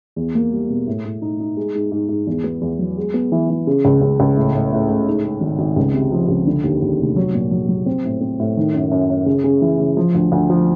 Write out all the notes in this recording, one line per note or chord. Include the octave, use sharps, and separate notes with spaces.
E2
A#3
G3
B2
A2
A2
D#4
D#4
G#3
G#2
G#2
G#2
E2
B3
E2
F#3
G#3
B3
E3
E3
C#3
C#2
C#2
C#2
A2
A2
A2
A2
G#2
G#3
G#1
G#1
C#2
C3
F3
C#2
D3
D#2
D#2
F1
F#3
A#2
F#3
F#3
C4
A2
C4
A2
D#3
F#2
F#2
F#2
C#3
C#3
E3
C#3
F3
D2
D2
F3